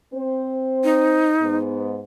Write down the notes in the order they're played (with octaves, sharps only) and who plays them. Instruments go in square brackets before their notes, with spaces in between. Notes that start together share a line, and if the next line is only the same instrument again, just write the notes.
[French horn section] C4 C5
[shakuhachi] D#4
[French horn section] G#2 B3